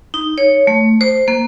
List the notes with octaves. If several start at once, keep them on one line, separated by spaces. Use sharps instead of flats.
D#4
C#5
A3
C5
A#3